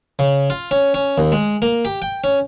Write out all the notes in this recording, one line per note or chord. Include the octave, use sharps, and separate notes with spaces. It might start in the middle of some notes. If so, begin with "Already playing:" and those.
C#3
F4
C#4
C#4
D#2
G#3
A#3
G4
G5
C#4